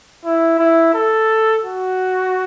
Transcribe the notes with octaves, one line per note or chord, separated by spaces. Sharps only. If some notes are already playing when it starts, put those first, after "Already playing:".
E4
E4
A4
F#4